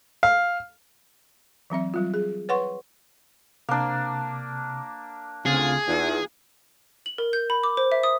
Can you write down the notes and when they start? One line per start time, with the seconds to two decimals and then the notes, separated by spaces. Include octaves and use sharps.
0.23 F5
1.70 E3 F#3 C4 E5
1.94 F#3 G3 F4
2.14 G#4
2.49 B4 C#5 F#5 C6 C#6
3.69 C3 A#3 D4
5.46 D2 C#3 C4 F4 G#4
5.88 E2 D#4 F4
7.06 F#7
7.18 A#4
7.33 G6
7.50 B5
7.63 D6
7.77 C5
7.92 E5
8.03 D#6